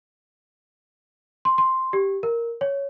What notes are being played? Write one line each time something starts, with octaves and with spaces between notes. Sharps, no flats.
C6
C6
G4
A#4
C#5